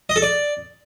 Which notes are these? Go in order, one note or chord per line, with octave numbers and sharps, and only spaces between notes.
D#5
A4
D5